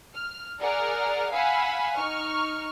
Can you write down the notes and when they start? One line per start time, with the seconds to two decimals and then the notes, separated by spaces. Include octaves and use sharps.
0.15 F6
0.60 G#4 A#4 D5 F#5 F6
1.33 F5 F#5 G#5 B5 E6
1.97 D#4 C#6 F6